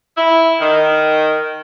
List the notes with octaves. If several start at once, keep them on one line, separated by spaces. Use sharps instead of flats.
E4
D#3